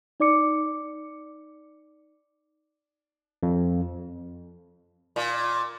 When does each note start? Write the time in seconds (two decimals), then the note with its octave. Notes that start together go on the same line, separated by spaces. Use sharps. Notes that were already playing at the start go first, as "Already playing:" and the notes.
0.20 D#4 D5 D6 C#7
3.43 F2
5.16 A#2